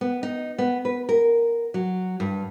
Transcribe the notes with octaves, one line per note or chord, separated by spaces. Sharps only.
B3
D#4
B3
B4
A#4
F#3
G2